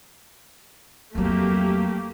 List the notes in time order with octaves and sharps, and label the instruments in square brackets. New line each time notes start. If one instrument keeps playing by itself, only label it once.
[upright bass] F2 F#3 [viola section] A3 A#3 G4